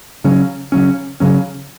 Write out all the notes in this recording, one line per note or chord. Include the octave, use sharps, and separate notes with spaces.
C#3 F#3 C#4
C#3 F#3 C#4
C#3 F#3 C#4